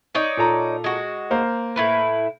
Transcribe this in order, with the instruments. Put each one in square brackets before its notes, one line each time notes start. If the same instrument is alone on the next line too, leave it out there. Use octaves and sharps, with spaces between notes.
[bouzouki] D#4 C#5 D5
[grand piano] A#2 A4 A#5
[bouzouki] G#3 F#4
[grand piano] A#3 C5
[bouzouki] A2 E4 B4